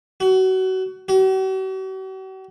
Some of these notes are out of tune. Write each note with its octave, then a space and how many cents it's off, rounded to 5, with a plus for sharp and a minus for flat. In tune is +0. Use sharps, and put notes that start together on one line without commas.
F#4 +25
F#4 +45